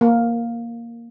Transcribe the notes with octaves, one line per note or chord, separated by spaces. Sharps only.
A#3